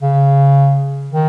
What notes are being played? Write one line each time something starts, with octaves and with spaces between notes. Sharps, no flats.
C#3
D#3